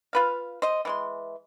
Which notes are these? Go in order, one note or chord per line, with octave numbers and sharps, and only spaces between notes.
F4 B4 F5
C5 D#5
E3 G#3 C6